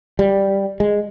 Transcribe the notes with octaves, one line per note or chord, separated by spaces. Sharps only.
G3
G#3